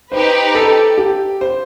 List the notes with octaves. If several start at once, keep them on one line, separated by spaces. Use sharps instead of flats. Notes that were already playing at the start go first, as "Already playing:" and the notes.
D#4 G4 B4 C5
A4
G4
C5